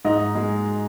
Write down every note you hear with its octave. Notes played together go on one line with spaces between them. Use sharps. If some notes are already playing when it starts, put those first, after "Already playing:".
G#2 D#4
G#3